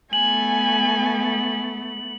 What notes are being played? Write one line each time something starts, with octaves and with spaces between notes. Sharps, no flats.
A3 B3 G#5 F#7